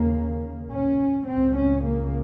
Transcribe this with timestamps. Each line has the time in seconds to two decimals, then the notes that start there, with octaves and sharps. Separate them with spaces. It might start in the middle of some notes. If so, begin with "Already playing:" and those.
Already playing: D#2 C#3 A#3
0.73 C#4
1.29 C#2 C#3 C4
1.57 C#4
1.85 A#3